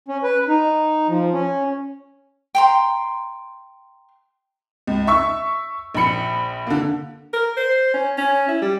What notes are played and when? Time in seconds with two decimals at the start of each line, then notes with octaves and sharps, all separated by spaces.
0.08 C#4
0.23 B4
0.48 D#4
1.08 F3
1.33 C#4
2.55 G5 A#5 C6
4.87 C#2
5.07 E5 C#6 E6
5.95 A#1 A#2 B5 C#7
6.67 D3 A#3
7.33 A#4
7.57 C5
7.94 C#4
8.18 C#4
8.48 E4
8.62 G3